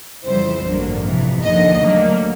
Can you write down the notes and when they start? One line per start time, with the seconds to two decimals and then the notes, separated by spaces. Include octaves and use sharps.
0.25 F2 C#3 E3 G3 C4 C5
0.65 A1 G2 D3 F#3 A#3
1.04 F2 C3 E3
1.43 D#2 D3 F3 D#5
1.82 D2 D3 F#3 A#3